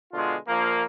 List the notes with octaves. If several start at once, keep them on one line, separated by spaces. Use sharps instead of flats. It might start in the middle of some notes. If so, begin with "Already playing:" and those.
B2 D3 G#3 F4
A#1 F3 A#3